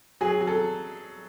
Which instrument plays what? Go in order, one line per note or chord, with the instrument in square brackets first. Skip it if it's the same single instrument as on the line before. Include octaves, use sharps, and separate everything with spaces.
[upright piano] F#3 G#4
F#3
A4